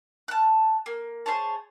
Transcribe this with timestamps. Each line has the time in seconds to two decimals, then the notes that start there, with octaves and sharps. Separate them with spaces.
0.28 A5 F#6
0.86 A#3
1.26 G#4 C5 C#5 A5